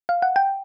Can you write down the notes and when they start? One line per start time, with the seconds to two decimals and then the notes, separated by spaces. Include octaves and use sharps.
0.09 F5
0.22 F#5
0.36 G5